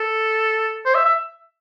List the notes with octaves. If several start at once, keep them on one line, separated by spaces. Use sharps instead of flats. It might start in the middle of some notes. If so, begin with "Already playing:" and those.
Already playing: A4
C5
E5
E5